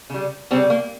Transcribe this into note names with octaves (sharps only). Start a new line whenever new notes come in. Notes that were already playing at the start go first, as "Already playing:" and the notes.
C#3 G3
C#3 G3 C4
A#3